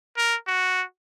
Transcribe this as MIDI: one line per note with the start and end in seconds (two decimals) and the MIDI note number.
0.17 0.36 70
0.47 0.83 66